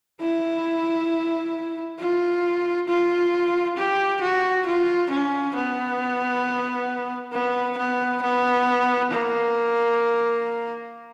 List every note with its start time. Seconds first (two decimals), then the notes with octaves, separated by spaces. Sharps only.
0.21 E4
2.00 F4
2.88 F4
3.77 G4
4.21 F#4
4.66 F4
5.11 C#4
5.55 B3
7.33 B3
7.78 B3
8.22 B3
9.11 A#3